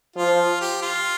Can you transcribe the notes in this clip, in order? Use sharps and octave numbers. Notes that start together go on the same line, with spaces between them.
F3 F4
G4
F4